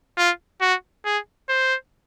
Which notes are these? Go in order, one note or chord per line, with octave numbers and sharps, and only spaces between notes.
F4
F#4
G#4
C5